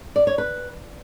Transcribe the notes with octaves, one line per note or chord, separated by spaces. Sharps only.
D5
C#5
B4